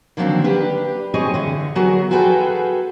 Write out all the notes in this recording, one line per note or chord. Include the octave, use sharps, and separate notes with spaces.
D3 D#3 F3 F#3 A#3 C4
D4 G4 B4
C4 G#4 C#5 D#5
D3 E3
F#3 B3 F#4 G#4 A#4
F4 F#4 G#4 A4 B4 G5